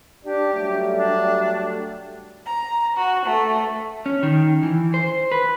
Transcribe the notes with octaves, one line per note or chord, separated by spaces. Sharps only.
D4 G4
F#3 G3 A3
D4
A#5
F#4
A3
C#4
D#3
E3
C5
B4